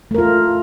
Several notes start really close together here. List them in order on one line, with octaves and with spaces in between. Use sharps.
A3 A#4 F4